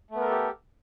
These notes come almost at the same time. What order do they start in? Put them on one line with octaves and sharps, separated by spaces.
A3 B3 A#4 A4 G4